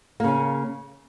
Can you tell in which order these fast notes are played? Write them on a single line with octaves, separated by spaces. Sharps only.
A#3 C#3 C#4